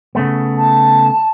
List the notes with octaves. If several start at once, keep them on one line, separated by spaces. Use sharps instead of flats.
C#3 A3 B3
A5